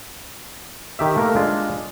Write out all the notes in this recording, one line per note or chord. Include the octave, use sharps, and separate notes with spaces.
D#3 G4 E5
A3 A#3 A#4
G#3 D4 F4